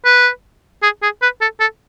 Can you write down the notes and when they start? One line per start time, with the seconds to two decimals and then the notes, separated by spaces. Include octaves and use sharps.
0.05 B4
0.83 G#4
1.02 G#4
1.22 B4
1.41 A4
1.60 A4